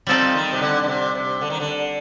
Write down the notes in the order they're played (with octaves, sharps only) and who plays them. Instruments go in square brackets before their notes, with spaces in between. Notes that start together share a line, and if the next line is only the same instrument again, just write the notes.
[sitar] F3 [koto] G3 C4 D#4 A4 D5
[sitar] D#3
C3
D3
D3
C3
C3
D3
D#3
D3